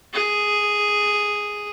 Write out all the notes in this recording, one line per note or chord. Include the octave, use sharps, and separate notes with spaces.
G#4